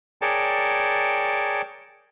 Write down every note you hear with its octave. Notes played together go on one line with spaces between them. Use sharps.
G#4 A#4 C#5 D5 G5 A5